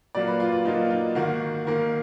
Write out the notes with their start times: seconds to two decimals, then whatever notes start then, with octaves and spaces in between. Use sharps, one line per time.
0.15 A#2 F#3 A#3 D5
0.27 B4
0.40 F4
0.52 F4
0.65 A#2 F#3 A#3 D#4
0.91 D#4
1.15 G#2 D#3 A#3 F#4
1.67 G#2 D#3 A#3 A#4